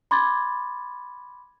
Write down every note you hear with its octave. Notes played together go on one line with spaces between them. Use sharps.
B5 C6 D6 G#6 A6